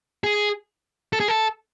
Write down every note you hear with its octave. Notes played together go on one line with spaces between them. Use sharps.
G#4
A4
G#4
A4